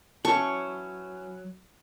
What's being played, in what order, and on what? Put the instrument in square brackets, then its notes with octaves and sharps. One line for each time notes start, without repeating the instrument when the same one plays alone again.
[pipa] E3 C#4 A5 [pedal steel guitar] F#3 [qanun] C#6